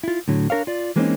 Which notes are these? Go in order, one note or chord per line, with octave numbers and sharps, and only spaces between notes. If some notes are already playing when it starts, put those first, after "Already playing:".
E4 F4
A2 D3 F#3
D4 A#4 C#5 F5
F4 D5
E3 G#3 A#3 C4 C#4 D#4